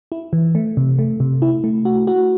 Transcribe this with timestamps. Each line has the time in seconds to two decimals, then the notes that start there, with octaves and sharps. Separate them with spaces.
0.12 E4
0.33 E3
0.55 A3
0.77 C3
0.99 A3
1.20 C3
1.42 E4
1.64 A3
1.85 F#4
2.07 F#4